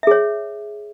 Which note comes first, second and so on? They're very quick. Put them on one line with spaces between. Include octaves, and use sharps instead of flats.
E5 G#4 C#5